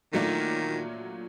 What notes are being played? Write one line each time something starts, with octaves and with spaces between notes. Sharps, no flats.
A#2 D#3 F#3 A3 D4 F4